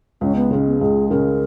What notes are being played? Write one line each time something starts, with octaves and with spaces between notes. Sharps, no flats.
C#2 C#4
B3
C#3 G#3 C#4
B3
C#2 G#4
C#3 G#3 C#4 A#4